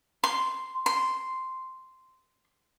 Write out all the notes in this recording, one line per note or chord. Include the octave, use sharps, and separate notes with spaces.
C6
C6